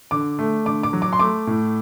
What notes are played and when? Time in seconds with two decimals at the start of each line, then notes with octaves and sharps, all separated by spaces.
0.11 D3 D6
0.39 A3
0.65 D3 D6
0.83 D6
0.93 F#3
1.02 D6
1.13 C6
1.19 A3 D6
1.47 A2